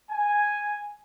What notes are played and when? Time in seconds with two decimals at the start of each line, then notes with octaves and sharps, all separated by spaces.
0.10 G#5